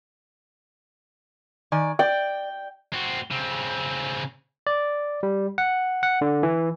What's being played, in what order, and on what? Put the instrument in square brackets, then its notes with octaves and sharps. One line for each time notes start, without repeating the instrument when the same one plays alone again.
[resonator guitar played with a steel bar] D#3 D5 G#5
[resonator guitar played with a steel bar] D5 [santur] G5
[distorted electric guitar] C4 F#4
C#3 C4
[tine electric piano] D5
G3
F#5
F#5
D3
E3